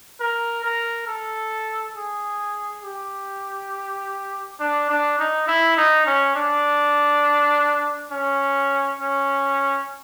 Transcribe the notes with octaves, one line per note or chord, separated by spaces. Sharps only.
A#4
A#4
A4
G#4
G4
D4
D4
D#4
E4
D#4
C#4
D4
C#4
C#4